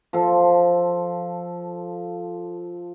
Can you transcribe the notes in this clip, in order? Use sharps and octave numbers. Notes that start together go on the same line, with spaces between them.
F3 A4